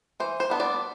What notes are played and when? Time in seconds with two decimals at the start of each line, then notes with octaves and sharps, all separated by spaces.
0.20 E3 C5
0.40 C5
0.50 G3 B3 D4
0.60 D5